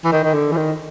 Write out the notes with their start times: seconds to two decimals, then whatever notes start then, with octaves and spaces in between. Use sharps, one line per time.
0.05 E3
0.12 D#3
0.24 D#3
0.34 D3
0.52 E3
0.57 D#3